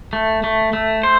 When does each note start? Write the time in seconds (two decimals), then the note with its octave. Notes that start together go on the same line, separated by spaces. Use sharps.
0.13 A3
0.44 A3
0.73 A3
1.03 C5